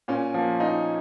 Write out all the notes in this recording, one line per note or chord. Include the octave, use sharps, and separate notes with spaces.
A#2 C#4
F3 A#3
A#2 D#4